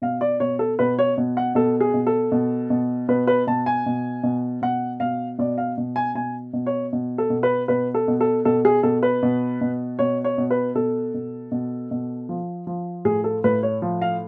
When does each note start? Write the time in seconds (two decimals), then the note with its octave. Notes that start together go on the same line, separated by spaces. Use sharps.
0.02 B2 F5
0.21 D5
0.40 B2 C#5
0.59 A4
0.79 B2 B4
0.99 C#5
1.17 B2
1.37 F#5
1.55 B2 A4
1.81 G#4
1.94 B2
2.07 A4
2.32 B2
2.70 B2
3.08 B2 B4
3.27 B4
3.47 B2 A5
3.66 G#5
3.86 B2
4.23 B2
4.62 B2 F#5
5.00 B2 F5
5.39 B2 D5
5.58 F5
5.78 B2
5.96 G#5
6.15 B2 G#5
6.53 B2
6.66 C#5
6.93 B2
7.18 A4
7.30 B2
7.43 B4
7.68 B2 B4
7.94 A4
8.08 B2
8.21 A4
8.45 B2 A4
8.65 G#4
8.83 B2 A4
9.03 B4
9.23 B2
9.61 B2
9.99 B2 C#5
10.24 C#5
10.38 B2
10.51 B4
10.75 B2 A4
11.14 B2
11.52 B2
11.91 B2
12.29 F3
12.67 F3
13.05 A2 G#4
13.24 A4
13.44 A2 B4
13.63 C#5
13.82 F3
14.02 F5